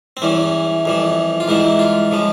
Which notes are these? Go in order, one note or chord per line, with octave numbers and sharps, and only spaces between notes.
C4
E2 E3 G3 C#4
F2 E3 G3
F4
G#2 E3 G3 E4
F4
C#3 F3 G#3